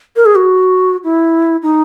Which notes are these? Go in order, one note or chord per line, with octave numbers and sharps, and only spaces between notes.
A#4
G#4
F#4
E4
D#4